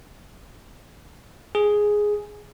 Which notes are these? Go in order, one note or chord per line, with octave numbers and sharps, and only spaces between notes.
G#4